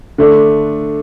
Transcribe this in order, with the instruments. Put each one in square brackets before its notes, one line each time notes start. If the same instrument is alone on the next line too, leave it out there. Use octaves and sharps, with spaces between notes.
[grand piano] D3 A3 D4